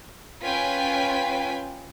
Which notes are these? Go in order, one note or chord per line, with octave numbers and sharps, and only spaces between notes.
C#4 F4 B4 G5 G#5 B6